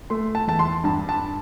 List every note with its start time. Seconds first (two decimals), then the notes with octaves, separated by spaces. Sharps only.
0.10 A3 C6
0.35 A5
0.47 E2 A5
0.59 C6
0.84 G2 A5
1.09 A5